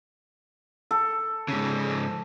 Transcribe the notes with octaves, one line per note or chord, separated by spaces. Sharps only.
A4
G#2 C#3